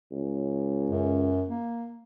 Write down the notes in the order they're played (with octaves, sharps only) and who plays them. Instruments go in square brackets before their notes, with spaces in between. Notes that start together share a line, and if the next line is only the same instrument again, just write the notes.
[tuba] C#2
[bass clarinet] F#2
A#3